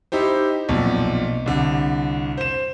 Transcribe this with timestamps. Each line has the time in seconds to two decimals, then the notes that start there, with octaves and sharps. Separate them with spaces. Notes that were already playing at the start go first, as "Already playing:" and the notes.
0.12 D#4 E4 G4 C5
0.69 B1 F2 A#2
1.46 C2 D3
2.38 C5 E7